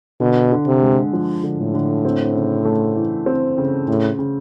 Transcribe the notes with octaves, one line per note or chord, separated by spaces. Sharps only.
B2 D3
D3
C3
G#3
F3
D3
A2
D3
C4
C#3
A3
E3
C4
C#3
A2 C#3
C#3